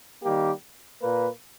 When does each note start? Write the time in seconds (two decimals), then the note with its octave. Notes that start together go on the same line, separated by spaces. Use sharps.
0.24 D#3 G3 A#3 G4
1.01 A#2 A#3 B4